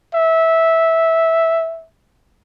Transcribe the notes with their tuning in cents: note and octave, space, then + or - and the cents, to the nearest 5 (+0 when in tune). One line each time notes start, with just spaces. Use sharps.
E5 -10